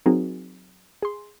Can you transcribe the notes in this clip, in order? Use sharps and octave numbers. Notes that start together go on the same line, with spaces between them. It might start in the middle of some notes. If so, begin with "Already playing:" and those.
F#3 C4 D#4 F#4 G#4 A#4
G#4 C6